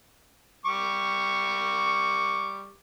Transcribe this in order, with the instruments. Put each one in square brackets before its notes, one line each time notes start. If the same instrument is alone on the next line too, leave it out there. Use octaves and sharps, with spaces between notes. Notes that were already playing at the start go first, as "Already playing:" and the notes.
[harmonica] G3 C#6 D6